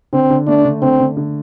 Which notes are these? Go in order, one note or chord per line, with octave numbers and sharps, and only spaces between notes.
D3 C4
D3
A3 D4
D3
D3 C4
D3
D3